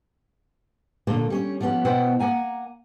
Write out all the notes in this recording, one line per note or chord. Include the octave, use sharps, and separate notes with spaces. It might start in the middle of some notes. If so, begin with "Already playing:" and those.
A#2 D3 A3 A#3
G3 C#4 C#5
F3 G3 B3 C#4 F#5
B2 B3 E4 C5 F#5 G5
A#3 F#5 G#5 A#5